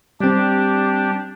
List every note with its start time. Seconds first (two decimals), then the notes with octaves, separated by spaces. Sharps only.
0.20 G3 C4 D4 G4